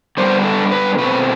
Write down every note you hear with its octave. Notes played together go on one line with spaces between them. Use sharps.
D3 G3 B3 D4 C5
A4
B4
B2 A3 C4 B4